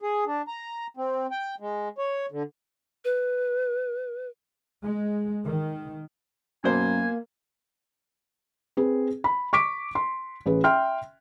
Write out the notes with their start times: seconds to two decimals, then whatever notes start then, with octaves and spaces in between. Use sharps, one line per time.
0.02 G#4
0.26 D4
0.48 A#5
0.97 C4
1.31 G5
1.60 G#3
1.98 C#5
2.31 D3
3.05 B4
4.82 G#3
5.47 D#3
6.64 F#2 B2 A#3 C5 G#5
8.77 C4 G#4 B4
9.24 B5
9.53 C#6 D6 B6 D7
9.95 C6
10.46 A1 G#4 B4
10.64 E5 G5 C6 F6